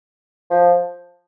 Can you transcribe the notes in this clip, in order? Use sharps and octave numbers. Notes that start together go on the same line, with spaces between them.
F3